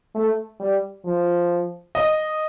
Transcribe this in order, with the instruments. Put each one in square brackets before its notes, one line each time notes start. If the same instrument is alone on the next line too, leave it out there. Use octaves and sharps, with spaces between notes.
[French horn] A3
G3
F3
[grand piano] D#5